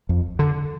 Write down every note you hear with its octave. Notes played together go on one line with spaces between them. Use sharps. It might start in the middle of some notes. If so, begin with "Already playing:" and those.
F2
D3